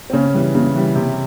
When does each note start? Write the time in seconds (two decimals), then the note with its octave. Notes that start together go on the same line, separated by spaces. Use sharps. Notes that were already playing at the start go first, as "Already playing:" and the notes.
0.10 C4
0.13 C#3 C#4
0.34 E3 G3
0.55 C#3
0.75 E3 G3
0.95 C3